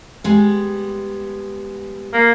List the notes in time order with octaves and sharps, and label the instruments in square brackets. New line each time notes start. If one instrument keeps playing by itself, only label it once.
[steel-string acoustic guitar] G3 G#3 B3
[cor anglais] A#3